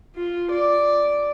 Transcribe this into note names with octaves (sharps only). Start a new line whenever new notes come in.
F4
D5